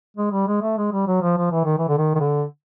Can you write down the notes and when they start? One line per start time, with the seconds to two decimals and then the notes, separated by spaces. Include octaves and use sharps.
0.17 G#3
0.31 G3
0.47 G#3
0.62 A3
0.78 G#3
0.92 G3
1.07 F#3
1.22 F3
1.38 F3
1.52 E3
1.65 D#3
1.78 E3
1.89 D3
1.98 D#3
2.15 D#3
2.20 D3